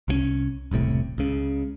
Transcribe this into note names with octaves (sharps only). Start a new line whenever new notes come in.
C2 F3 C#4
E1 C2 A2 C3
C#2 C#3